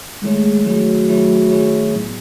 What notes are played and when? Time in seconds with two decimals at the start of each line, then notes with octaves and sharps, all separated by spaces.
0.22 D#3 G#3 A3 E4 G#4 C#5
0.65 D#3 F#3 A3 E4 G#4 C#5
1.09 D#3 A3 E4 G#4 C#5
1.51 D#3 A3 E4 G#4 C#5
1.93 A2 F#3 B3